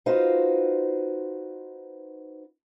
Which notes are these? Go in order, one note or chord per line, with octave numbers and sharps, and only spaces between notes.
D#4 F4 F#4 B4 C5 F5